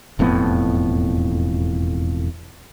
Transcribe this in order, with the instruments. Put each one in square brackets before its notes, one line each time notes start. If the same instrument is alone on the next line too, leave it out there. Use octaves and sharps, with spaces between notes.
[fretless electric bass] E1 F2 A2 B3